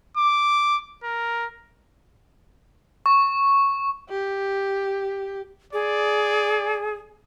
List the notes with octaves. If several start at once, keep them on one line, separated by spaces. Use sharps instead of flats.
D6
A#4
C#6
G4
G#4 D5